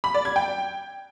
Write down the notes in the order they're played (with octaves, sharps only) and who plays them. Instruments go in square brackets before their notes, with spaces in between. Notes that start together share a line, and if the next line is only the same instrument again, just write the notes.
[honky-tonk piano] B5
D5
G#6
G5